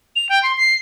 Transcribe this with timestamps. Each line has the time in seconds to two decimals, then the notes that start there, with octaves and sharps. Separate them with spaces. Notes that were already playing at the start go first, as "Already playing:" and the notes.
0.16 F7
0.29 G5
0.43 C6
0.57 C7